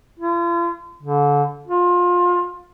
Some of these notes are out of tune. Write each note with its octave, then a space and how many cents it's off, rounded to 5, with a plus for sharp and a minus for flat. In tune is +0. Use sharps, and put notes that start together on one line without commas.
F4 -40
D3 -30
F4 +25